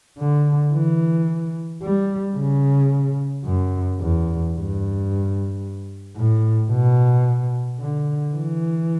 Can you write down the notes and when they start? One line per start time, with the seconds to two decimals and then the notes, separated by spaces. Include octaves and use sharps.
0.19 D3
0.73 E3
1.82 G3
2.36 C#3
3.45 F#2
3.99 E2
4.54 G2
6.17 A2
6.71 B2
7.80 D3
8.34 E3